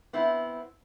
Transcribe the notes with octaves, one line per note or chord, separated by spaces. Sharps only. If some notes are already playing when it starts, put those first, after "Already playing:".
B3 C4 E4